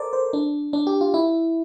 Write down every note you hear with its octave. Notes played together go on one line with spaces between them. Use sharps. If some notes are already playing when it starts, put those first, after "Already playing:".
Already playing: A4 A#4 C5 D5
C5
D4
D4
G4
F4
E4